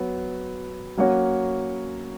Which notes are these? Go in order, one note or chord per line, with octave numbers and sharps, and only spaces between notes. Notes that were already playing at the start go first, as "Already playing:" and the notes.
Already playing: F#3 B3
F#3 A#3 C#4 F#4 C#5